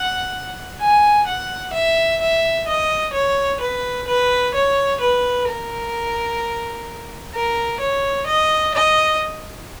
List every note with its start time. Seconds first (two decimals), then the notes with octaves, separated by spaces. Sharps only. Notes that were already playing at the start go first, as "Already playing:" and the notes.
Already playing: F#5
0.82 G#5
1.28 F#5
1.75 E5
2.22 E5
2.68 D#5
3.14 C#5
3.61 B4
4.08 B4
4.55 C#5
5.02 B4
5.49 A#4
7.36 A#4
7.82 C#5
8.28 D#5
8.76 D#5